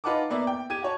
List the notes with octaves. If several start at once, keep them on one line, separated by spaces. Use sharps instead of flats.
D#4 F4 B4 F#5 A5 D6
A#3 B3 D5 E5
G5
G4 G#6 D#7
F#4 C#5 A5